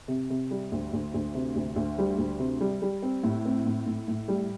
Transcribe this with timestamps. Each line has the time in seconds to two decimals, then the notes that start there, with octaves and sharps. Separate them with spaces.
0.08 C3
0.30 C3
0.51 G3
0.72 D2
0.93 D2
1.14 D2
1.35 C3
1.56 D2
1.76 D2
1.98 G3
2.18 D2
2.39 C3
2.61 G3
2.82 G3
3.02 C4
3.24 A2
3.45 C4
3.66 A2
3.86 A2
4.08 A2
4.28 G3